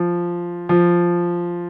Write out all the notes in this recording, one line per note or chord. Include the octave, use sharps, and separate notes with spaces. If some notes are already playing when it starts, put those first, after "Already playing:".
Already playing: F3
F3